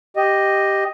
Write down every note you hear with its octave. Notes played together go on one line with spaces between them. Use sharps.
G4 D#5